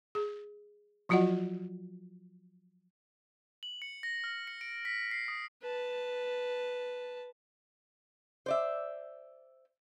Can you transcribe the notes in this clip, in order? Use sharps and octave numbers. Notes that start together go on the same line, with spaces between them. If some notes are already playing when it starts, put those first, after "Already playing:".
G#4
F3 F#3 F4 F#4 D#5 F#5
F#7
C#7
A#6
F6
C#7
D7
B6
C7
D#6
B4 A5
C5 D5 E5